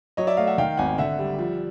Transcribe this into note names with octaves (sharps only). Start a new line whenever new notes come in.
F#3 C#5 D#5
D5 E5
A3 D#5 F5
E5 F#5
D#3 F5 G5
G#1 F#5 G#5
D3 E5 F#5
G3
F3